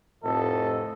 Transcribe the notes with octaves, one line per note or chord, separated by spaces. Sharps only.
F1 A2 F3 A4 D#5